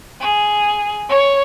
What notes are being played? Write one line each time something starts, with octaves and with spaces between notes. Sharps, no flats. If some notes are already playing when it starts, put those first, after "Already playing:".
G#4
C#5